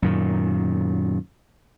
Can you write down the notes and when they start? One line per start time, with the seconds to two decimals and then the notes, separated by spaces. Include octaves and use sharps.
0.02 F#2 A#2 D#3